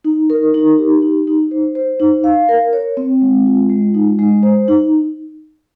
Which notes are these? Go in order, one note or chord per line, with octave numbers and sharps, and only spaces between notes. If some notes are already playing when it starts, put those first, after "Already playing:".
D#4
A#4
D#4
G4
D#4
D#4
C5
C5
D#4
F5
A#4
C#5
C4
G#3
F4
G#3
D#4
G#3
C5
D#4